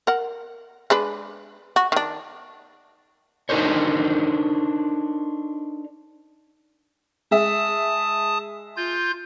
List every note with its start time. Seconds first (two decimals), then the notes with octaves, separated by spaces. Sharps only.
0.07 A#4 F#5
0.90 G#3 D4 B4
1.76 F#4
1.92 D#3 D4
3.49 D4 D#4 A4 A#4 C5 C#5
7.31 G#3 E5 A5 D#6
8.76 F4 G6